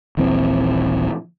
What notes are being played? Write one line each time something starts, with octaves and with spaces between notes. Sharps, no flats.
D#1 A#1 E3 C4